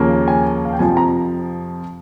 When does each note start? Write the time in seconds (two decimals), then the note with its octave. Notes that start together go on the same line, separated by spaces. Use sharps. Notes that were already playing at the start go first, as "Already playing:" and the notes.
Already playing: D#2 C#3 F3 A#3 C#4
0.28 G#5
0.65 F5
0.73 G5
0.79 F2 C3 F3 G#5
0.97 A#5